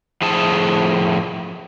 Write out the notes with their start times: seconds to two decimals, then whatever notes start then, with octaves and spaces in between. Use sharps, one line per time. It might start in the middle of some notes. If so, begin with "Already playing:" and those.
0.22 A2 F3 G#4 A5